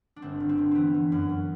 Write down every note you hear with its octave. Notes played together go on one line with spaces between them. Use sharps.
D4
G1 C4
G1
C4
G1
E3 B3 C4
E3
F#2
F#2